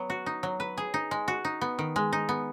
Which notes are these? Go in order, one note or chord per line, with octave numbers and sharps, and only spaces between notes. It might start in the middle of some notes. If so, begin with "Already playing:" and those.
Already playing: F#3 B3
F#4
D#4
F#3
B4
G#4
D#4
G#3
F#4
D#4
B3
D#3
G#3
D#4
B3